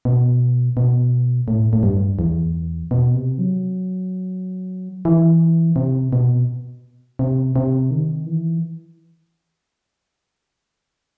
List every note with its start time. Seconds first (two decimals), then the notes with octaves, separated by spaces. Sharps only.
0.05 B2
0.77 B2
1.48 A2
1.73 A2
1.83 G2
2.19 E2
2.91 B2
3.15 C3
3.39 F#3
5.05 E3
5.76 C3
6.13 B2
7.19 C3
7.56 C3
7.91 D#3
8.26 E3